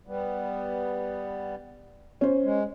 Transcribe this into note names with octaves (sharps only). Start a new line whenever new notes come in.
G3 B3
C#4 C5
G#3